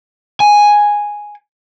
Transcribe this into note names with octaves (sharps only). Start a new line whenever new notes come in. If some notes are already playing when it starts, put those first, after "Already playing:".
G#5